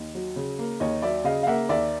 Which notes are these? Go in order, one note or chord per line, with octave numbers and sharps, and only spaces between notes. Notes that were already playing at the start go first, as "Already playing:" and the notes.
Already playing: D#2 D#5
F#3
C#3
A#3
D#2 C#5 D#5
F#3 D5 E5
C#3 D#5 F5
F5
A#3 E5 F#5
D#2 D5 E5